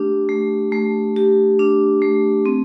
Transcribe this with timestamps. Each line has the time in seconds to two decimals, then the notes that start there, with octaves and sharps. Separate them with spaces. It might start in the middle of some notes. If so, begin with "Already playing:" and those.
Already playing: A3 D4 G4
0.29 A3
0.72 A3
1.16 G4
1.59 D4
2.02 A3
2.46 C4